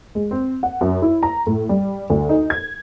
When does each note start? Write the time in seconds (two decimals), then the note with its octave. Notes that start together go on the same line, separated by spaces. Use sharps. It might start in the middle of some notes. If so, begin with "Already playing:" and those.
0.15 G#3
0.31 C4
0.63 F#5
0.81 F#2
1.02 E4
1.23 A#5
1.47 A2
1.69 G3
2.10 D2
2.29 D#4
2.50 G#6